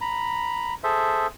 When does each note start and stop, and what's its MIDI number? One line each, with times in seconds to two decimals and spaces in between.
0.01 0.74 82
0.01 0.74 83
0.84 1.27 68
0.84 1.27 69
0.84 1.27 72
0.84 1.27 76